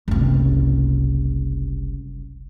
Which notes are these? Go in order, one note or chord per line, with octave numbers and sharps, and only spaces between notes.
F#1 C2